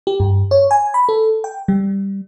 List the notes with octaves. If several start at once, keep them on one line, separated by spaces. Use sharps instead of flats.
G4
G2
C#5
G#5
B5
A4
G5
G3